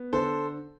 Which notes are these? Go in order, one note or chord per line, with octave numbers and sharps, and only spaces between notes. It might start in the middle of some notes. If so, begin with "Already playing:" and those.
Already playing: B3
D3 A4 C5